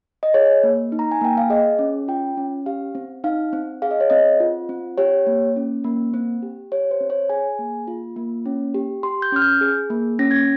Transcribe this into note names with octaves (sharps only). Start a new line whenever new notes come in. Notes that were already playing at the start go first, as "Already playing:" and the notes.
D#5
G#4 C#5
A#3
D#4
A#5
G#5
A#3 G5
F5
G#4 D#5
C#4
F4 G5
C#4
G4 F5
C4
D#4 F5
C4
G#4 F5
D#5
C#5
C4 D#5
F4
C4
G4 C#5
A#3
C#4
A#3
C4
G4
G4 C#5
C5
C4
C#5
G#4 G#5
A#3
F4
A#3
C#4
G4
G4 C6
G6
C#4 F6
G6
G#4
A#3
C#4 A#6
G#6